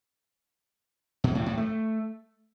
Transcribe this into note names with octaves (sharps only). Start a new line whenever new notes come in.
B2
A2
A2
A3